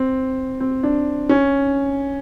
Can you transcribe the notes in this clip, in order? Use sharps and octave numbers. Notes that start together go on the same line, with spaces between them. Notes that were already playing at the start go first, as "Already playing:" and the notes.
Already playing: C4
C4
D4
C#4